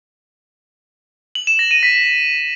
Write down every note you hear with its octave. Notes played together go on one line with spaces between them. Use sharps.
F#7
E7
A#6
D#7
B6